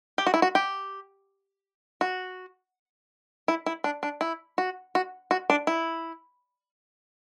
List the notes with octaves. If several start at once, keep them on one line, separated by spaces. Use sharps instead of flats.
G4
F#4
E4
F#4
G4
F#4
E4
E4
D4
D4
E4
F#4
F#4
F#4
D4
E4